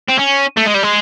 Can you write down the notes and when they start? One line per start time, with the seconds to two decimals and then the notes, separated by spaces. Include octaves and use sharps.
0.09 C4
0.19 C#4
0.57 A3
0.66 G#3
0.74 G3
0.83 G#3